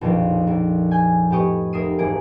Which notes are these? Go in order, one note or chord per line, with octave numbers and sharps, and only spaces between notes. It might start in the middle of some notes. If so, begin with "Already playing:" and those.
A#1 F2 B2 D#3 F3
A#1
G#5 G6
A2 B3 G4 D#5 C#6
F1 A#4 D#6 E6 C7 D#7
D#1 G#1 E3 A#3 G#4 D7